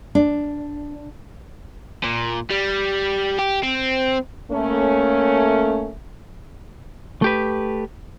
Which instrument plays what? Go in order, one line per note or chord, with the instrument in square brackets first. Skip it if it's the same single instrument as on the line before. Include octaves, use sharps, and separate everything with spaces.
[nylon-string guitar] D4
[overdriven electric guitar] A#2
G3
G4
C4
[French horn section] A3 A#3 C#4
[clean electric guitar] A3 G4 B4